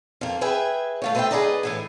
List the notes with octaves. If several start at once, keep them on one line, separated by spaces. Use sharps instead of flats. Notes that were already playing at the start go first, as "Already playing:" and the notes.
F2 A#3
G#4 B4 E5 G5 G#5
A3 F4 C#5
A3 B4 C5 D5 E5 G5
G#4 A#4 B4 D5 D#5 A#5
A2 E3 G#5